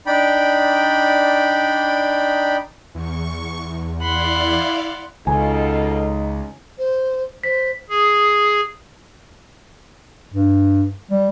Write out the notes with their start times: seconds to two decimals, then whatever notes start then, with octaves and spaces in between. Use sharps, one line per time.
0.07 D4 D#4 D5 G5 B5
2.95 E2 C#6
4.02 E4 D5 F5 F#5 B5 C6
5.27 C#2 B2 D#4 F4 A4 G#5
6.78 C5
7.44 C5 B6
7.90 G#4
10.33 G2
11.11 G3